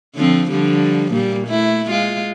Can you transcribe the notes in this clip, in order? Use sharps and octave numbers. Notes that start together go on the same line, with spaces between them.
D3 F3 C4
D3 F3 G3
A#2 G3 A#3
A3 E4
G#3 F4